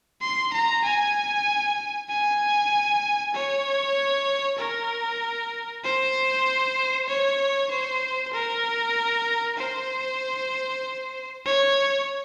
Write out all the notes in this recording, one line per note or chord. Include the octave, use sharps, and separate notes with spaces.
C6
A#5
G#5
G#5
C#5
A#4
C5
C#5
C5
A#4
C5
C#5